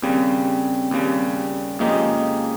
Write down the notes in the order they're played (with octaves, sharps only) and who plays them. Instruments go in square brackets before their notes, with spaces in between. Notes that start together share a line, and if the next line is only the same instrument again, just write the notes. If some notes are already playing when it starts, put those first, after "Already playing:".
[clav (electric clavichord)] D#2 C#3 G3 [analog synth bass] C4
[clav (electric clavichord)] D#2 C#3 G3
[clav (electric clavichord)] F2 C#3 G#3 D#4 G4 [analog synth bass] A#3